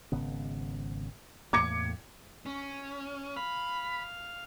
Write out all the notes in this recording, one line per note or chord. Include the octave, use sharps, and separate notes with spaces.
G#1 C#3 B3
E2 A2 A#3 D6 G#6 C#7
C#4
F5 B5